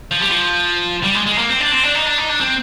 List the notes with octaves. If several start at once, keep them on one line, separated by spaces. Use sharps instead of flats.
F3
G3
F3
G3
G#3
G#3
A#3
C4
D4
C4
D4
D#4
D4
D#4
D4
C4